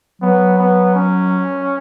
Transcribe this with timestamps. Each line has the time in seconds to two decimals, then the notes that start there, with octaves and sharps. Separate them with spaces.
0.22 F#3 B3
0.58 B3
0.95 C#4